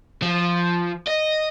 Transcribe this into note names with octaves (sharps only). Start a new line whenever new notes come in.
F3
D#5